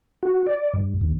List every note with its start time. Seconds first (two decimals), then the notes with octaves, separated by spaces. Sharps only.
0.23 F#4
0.46 D5
0.74 G2
1.01 D#2